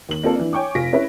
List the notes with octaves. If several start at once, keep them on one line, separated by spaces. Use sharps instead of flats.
D#2 F#7
A#3 C4 F4 A4
E3 D4
C#5 G5 G#5 C#6 D6
F1 F4 G#5 A#6 B6 D7
C#4 E4 B4 C#5 E5